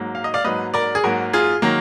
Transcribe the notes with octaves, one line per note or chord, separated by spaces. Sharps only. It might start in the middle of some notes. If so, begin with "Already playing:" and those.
Already playing: G#2 F#3 A#3
F5
D#5
D5 F5
G#2 F#3 A#3 B4 D#5
A#4 D5
G#4
G#2 F#3 A#3 F#4 A#4
F4 G#4
D#3 F#3 A#3